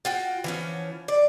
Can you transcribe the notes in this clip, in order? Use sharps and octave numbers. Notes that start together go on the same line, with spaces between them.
F4 F#4 G5
E3 F3 C#4
D5